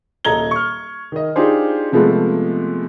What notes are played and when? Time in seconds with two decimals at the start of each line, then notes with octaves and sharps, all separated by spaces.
0.25 D#1 A4 D#5 A#5 G#6 G7
0.51 C#6 F6
1.12 D#3 D#5
1.36 D4 D#4 F4 G4 G#4 C5
1.92 C3 F3 G#3 A3 B3